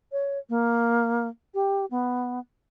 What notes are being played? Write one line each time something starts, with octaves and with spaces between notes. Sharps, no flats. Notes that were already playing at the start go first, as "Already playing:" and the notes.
C#5
A#3
G4
B3